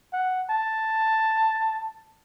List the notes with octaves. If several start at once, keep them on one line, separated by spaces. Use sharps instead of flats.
F#5
A5